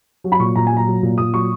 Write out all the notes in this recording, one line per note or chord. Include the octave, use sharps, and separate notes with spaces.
F#3
B5
A#2 C#6
A#2 A#5
G#5
F#3 A#5
F#3
A#2
A#2 D#6
F#3 C#6